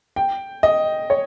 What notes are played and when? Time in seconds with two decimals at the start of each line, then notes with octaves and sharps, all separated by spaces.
0.16 G5
0.63 D#5
1.10 C#5